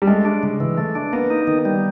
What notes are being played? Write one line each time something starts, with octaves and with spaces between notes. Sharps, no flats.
G3
G#3 A3
D4
C#3
E3
A3
D4
A#3 B3
D#4
D#3
G3